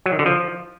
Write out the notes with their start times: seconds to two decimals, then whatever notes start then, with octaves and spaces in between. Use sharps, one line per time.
0.06 F#3
0.12 D#3
0.19 D3
0.26 F3